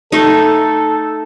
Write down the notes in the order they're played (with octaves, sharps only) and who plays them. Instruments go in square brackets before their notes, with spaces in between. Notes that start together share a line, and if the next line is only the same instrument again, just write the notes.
[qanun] A3 D#4 [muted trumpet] A4